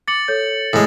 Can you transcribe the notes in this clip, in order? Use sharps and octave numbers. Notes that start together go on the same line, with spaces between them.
D6 A6 C#7 F#7
A4 C#5 G6
A2 G#3